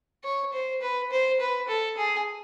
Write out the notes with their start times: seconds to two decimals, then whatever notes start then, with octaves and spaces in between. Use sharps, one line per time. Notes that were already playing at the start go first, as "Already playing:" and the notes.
0.24 C#5
0.53 C5
0.82 B4
1.11 C5
1.40 B4
1.68 A4
1.97 G#4